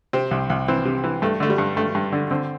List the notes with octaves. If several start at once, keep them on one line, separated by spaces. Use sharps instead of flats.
C3 C4
C2
C2
E3 C4
C3
E3
G2 A3
D3 A3
G3
G2
G2 A3
G2
D3
D3 C4